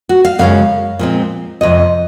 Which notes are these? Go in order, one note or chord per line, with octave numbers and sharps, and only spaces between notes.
F#4
F5
F#2 C#3 G#3 C#4 F5
A#2 F3 G#3 C4
F2 C3 D#5